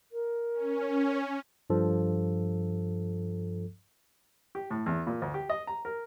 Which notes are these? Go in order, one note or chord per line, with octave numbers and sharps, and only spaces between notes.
A#4
C#4
G2 F3 A4
G4
A2
E2
A#2
D2
G4
D#5
A#5
A#4